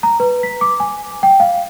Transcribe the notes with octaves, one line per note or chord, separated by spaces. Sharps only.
A#5
B4
B6
D6
G#5
G5
F5